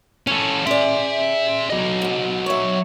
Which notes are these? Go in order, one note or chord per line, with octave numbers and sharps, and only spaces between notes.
A2 C#4 A4
G#4 D5 E5 C6
F#3 D#5
F2 G#2
C#5 E5